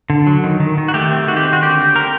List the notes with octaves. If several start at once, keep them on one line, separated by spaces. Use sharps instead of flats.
D3
F#3
D#3
D#3
D#3
F#4
A3 G4
C4
D#3 F#4
G4
C4
F#4
D3 G4
C4
C4 A#4